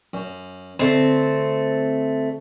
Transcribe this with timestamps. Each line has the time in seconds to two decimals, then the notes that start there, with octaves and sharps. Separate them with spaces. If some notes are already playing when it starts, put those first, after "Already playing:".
0.14 F#2
0.79 D2 A3 C4